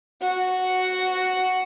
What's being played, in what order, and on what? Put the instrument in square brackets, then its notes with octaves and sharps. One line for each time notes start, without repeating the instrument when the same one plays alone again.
[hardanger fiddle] F#4